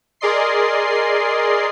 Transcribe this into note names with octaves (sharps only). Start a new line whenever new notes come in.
G#4 A#4 D5 D#5 C6 C7